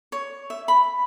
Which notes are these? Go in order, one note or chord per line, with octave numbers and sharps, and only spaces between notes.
C#5
E5
B5